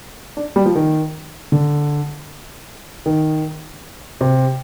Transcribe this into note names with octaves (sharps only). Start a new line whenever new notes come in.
D4
G3
F3
D#3
D3
D#3
C3